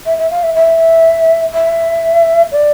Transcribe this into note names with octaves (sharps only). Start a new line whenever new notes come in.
E5
E5
F5
E5
E5
E5
D5